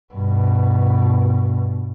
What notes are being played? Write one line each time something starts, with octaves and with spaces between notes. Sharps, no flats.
G2 B2